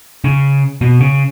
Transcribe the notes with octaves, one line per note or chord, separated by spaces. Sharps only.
C#3
B2
C#3